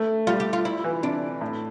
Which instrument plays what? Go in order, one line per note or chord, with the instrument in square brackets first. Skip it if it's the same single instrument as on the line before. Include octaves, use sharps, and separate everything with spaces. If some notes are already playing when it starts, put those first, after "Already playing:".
Already playing: [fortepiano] A3
[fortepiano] G3 [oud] F4
[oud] G4
F4
E4
[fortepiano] E3
[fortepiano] C3 [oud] D4
[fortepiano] A2